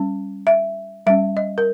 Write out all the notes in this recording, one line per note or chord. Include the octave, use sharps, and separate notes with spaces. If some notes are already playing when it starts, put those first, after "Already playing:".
Already playing: G3 C#4
E5
G3 C#4 E5
D#5
A#4